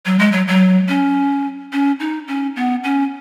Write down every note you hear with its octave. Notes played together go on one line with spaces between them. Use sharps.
F#3
G#3
F#3
F#3
C#4
C#4
D#4
C#4
B3
C#4